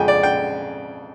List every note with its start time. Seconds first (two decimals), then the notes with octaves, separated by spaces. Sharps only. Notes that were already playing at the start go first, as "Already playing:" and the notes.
Already playing: F2 C#3 F3 G#3 G5 G#5
0.08 D5
0.23 G5